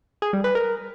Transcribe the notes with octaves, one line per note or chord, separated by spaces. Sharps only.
G#4
G3
B4
A#4